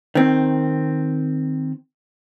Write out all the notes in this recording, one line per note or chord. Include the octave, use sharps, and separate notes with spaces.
D#3 C4